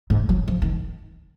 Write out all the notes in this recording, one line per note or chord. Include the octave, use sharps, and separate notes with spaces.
G#2
F#3
F3
D#3